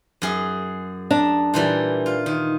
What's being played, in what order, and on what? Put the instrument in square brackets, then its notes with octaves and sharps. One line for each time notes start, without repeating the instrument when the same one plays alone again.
[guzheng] F#2 G#4
[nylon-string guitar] D4 [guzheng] A#5
[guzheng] A#2 E3 G3
F4
D#3